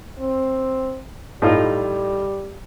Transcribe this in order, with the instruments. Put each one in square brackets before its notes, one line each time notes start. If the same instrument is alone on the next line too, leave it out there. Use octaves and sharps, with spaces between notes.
[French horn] C4
[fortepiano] A2 D#4 F4 [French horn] G3